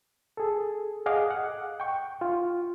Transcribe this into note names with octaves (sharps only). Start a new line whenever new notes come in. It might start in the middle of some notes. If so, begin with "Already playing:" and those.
G#4 A4
G#4 D#5 F5 F#5 D6
F#5
G5 C#6
F4